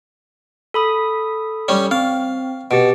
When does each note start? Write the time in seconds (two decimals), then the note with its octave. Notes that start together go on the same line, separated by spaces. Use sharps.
0.74 A4 B5 D#6
1.68 G3 C#4
1.91 C4 F5
2.71 B2 G4 D7